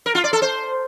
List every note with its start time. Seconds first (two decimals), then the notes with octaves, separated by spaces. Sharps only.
0.06 A#4
0.15 F4
0.24 D5
0.33 A4
0.42 C5